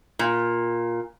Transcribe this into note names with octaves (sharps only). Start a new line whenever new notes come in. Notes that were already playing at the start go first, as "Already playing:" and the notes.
A#2